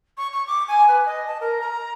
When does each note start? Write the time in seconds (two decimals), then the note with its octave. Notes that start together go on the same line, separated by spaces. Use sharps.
0.17 C#6
0.32 C#6
0.47 D6
0.68 G#5
0.88 B4
1.06 D#5
1.27 A5
1.41 A#4
1.61 A#5